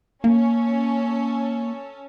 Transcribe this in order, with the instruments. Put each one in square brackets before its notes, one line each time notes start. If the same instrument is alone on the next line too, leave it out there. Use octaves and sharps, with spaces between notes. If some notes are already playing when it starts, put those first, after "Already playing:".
[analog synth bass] A#3 [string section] C#4 A4